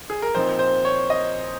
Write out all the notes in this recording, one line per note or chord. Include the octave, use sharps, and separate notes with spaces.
G#4
A#4
A#2 F3 C4 D#4 C5
C5
C#5
D#5